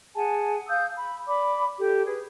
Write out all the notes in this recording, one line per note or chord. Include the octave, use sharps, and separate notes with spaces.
G#4 F#5 G#5 A5
F5 D#6 E6 G6
B5
D5 B5 D6
G4 A4
G#4 B4